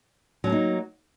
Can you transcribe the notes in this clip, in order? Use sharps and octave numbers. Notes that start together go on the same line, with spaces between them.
F#3 A#3 C#4 D#4